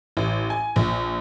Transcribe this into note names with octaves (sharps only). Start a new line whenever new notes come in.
A1
G#5
A#1